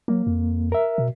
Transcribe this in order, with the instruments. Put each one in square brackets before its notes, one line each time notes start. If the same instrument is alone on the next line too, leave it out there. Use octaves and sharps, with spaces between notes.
[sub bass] F#3 [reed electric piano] A#3
[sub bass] F2
[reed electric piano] A#4 E5
[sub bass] B2